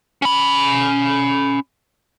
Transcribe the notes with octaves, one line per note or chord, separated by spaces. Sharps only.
C#4 B5